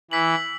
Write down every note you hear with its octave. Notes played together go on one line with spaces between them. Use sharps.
E3 E6 B6 F#7